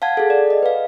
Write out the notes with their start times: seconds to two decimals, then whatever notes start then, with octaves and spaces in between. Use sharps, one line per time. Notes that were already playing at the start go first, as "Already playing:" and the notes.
0.02 F5 F#5 A5 G#6
0.17 G#4 A4
0.30 D5
0.50 D#5
0.63 B4 F5